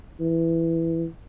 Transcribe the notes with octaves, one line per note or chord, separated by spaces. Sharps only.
E3